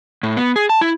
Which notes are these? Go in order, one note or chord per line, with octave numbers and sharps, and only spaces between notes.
A2
B3
G#4
A5
E4